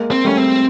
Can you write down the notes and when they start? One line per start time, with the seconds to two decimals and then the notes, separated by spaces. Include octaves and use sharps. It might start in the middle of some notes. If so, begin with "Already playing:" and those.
Already playing: G#3 A#3
0.11 C4
0.24 G3 A3 C#4
0.38 C4